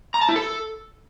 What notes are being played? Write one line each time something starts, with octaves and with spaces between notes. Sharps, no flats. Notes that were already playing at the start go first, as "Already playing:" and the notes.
A#5
A5
E4
A4